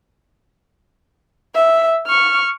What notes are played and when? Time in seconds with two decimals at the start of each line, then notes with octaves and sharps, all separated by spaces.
1.54 E5
2.07 C#6 F6